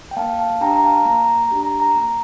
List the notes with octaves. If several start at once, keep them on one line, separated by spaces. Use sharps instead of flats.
G5
A#3 F5 A5
F5 A5
D4 G4 G5 A#5
A#5
F5 A5
A#3 A#5
A#5
A#5
D4 G4
A#5
A#5
A#3 A#5